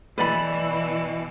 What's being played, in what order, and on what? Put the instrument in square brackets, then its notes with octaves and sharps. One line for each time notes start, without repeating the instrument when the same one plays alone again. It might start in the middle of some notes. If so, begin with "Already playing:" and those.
[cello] B2 E3 [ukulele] B4 D5 B5